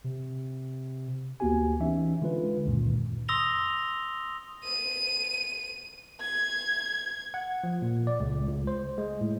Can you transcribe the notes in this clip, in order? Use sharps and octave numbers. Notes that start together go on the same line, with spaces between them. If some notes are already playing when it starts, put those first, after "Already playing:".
C3
D2 A#3 B3 F#4 G4 G#5
E3 C#4 D#4 E5
D3 G#3 F4 B4
C#2 F#2 A#2 D#3
C6 D#6 E6 A#6 F7 G7
D#7
G#6
F#5
F3
A#2
D5
C#2
C#2
C5
G#3
A2